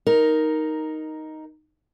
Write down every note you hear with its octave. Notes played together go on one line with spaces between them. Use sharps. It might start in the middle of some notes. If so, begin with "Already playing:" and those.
D#4 A#4